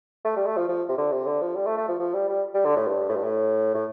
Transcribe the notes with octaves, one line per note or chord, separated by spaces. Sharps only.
A3
G3
A3
F3
F3
C3
D3
C3
D3
F3
G3
A3
A3
F3
F3
G3
G3
G3
D3
A2
G2
A2
G2
A2
A2